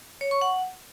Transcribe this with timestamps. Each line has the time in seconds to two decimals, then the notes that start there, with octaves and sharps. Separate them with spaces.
0.21 C#5
0.31 C#6
0.41 F#5